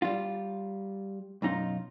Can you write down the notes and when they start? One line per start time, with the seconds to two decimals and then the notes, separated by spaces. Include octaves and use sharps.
0.02 G3 F4
1.42 B1 F#2 D#4 F4